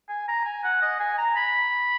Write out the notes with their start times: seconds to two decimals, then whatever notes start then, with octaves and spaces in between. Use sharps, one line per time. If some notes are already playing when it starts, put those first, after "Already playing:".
0.09 G#5
0.28 A#5
0.45 G#5
0.64 F#5
0.82 D#5
1.00 G#5
1.18 A#5
1.36 B5